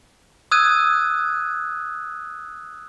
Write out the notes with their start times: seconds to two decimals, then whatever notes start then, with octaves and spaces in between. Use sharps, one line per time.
0.51 D#6 E6 F#6 G#6 D#7